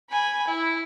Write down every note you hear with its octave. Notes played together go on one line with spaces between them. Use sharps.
G#5 B5
E4